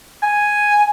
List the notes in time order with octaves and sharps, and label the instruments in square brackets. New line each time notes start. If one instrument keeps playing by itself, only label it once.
[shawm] G#5